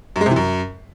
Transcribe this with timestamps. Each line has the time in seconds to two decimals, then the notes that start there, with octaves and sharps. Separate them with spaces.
0.16 F#2
0.21 G#3
0.26 C3
0.31 E3
0.36 F#2